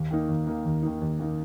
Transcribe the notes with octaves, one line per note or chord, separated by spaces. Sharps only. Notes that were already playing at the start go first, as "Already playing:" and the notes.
Already playing: D#2
D#3 A#3 D#4
D#2
D#3 A#3 D#4
D#2
D#3 A#3 D#4
D#2
D#3 A#3 D#4